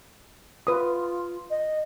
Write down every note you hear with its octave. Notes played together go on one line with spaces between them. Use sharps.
F4 B4 D#6
D#5